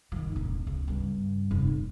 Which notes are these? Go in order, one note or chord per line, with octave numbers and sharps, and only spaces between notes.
D#3 F3
E1 A2
C#2
G2 C#3
F1
A#2